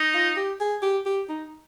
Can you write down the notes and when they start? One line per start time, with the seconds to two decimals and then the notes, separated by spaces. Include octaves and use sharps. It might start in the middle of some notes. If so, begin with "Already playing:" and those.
Already playing: D#4
0.14 F4
0.36 G4
0.60 G#4
0.82 G4
1.06 G4
1.29 D#4